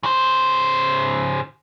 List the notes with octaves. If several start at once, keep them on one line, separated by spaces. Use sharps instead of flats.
C#3 C5